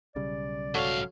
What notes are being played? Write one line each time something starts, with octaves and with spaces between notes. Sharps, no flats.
B1 C#3 G3 D5
G#2 F#4 A4 C#5 F5